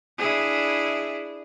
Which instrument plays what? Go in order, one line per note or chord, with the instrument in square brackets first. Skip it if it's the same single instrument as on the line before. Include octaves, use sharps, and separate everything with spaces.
[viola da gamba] D4 E4 G#4